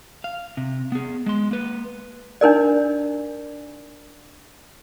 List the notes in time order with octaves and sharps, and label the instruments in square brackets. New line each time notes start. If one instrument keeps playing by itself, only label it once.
[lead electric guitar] F5
C3
B3 G#4
G#3 C6
A#3 B4
[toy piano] D4 D#4 A#4 D5